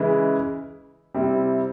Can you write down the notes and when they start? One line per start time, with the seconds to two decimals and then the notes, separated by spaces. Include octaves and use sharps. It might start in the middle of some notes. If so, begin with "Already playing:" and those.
Already playing: C#3 E3 G#3 E4
1.14 C3 G3 C4 E4